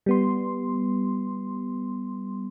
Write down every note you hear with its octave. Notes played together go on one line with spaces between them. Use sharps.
G3 B3 C6